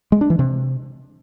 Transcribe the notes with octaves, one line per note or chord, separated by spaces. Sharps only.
G#3
D4
E3
C3